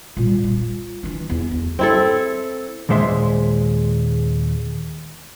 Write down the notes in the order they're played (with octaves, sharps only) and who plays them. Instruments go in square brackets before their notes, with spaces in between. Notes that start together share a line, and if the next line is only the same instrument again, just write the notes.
[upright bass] A#2 G3
F4
E3 D4
E2
D2
[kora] C4 E4 A4
[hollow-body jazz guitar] D#2 A#2 G#3 C5 E5 C6